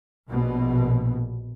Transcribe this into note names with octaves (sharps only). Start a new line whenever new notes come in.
A#1 B2